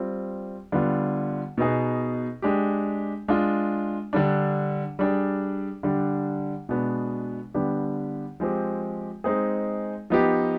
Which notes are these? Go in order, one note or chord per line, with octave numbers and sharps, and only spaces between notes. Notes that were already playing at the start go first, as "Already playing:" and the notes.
Already playing: G3 C4 F4
D3 G3 B3 F4
B2 B3 D#4 G#4
G#3 D4 G4
G#3 D4 F4
D3 G3 D4
G3 D4 G#4
D3 G3 D4
B2 G#3 B3 D4
D3 G3 B3 D4 G4
F3 G#3 C4 G4
G#3 C4 D#4 G#4
F3 B3 D#4 G4